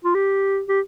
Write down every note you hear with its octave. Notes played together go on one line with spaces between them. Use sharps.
F4
G4
G4